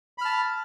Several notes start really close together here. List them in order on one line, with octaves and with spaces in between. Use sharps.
B5 F6 A5